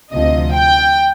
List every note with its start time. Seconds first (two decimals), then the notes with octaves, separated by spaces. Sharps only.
0.11 D2 C3 F3 D#5
0.54 G5